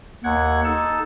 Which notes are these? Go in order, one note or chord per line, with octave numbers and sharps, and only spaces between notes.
D#2 F#5 G#6
D#4 A4 A5